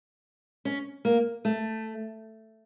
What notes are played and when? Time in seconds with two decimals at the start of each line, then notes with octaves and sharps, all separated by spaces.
0.65 C#4
1.05 A#3
1.45 A3